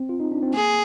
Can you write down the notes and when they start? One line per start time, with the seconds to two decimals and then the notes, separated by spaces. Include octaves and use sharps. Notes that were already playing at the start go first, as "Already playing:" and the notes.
Already playing: C4
0.09 F4
0.20 D#4
0.32 D4
0.43 C4
0.54 A#3 G#4